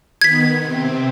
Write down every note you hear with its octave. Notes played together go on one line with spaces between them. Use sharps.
D#3 B3 G#6 B6
C3 C4